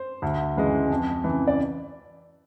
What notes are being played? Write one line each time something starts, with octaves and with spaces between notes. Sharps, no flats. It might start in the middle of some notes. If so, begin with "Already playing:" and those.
Already playing: C5
D2
C#3 E3 G#3
F2
C#3 E3
D5